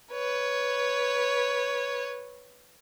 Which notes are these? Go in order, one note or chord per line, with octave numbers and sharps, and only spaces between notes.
B4 C#5